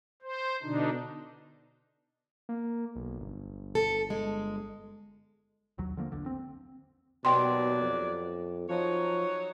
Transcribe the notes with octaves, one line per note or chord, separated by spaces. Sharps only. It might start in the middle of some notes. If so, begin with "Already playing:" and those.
C5
B2 D3 D4 D#4
A#3
B1
G1
A4
G#3
A#1 D#2 F#3
D3 F3 A#3
A#1 E2 D3
C4
D#2 B2 F#3 D5 G5 C6
F2
F3 F#3 D#4 C#5